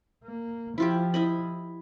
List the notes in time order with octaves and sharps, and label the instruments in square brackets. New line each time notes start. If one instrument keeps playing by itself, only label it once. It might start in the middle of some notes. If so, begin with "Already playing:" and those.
[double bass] A#3
[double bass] F3 [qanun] E4 F4 G4
[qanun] E4 D#5 B5